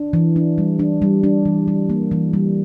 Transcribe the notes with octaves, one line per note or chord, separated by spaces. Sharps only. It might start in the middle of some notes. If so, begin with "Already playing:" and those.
Already playing: D4
E3
D4
G3
D4
G3
D4
E3
G3
A#3
E3
G3